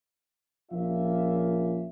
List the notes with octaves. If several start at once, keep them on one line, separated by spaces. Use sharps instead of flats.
A#1 F3 A#3 C#4 F4 E5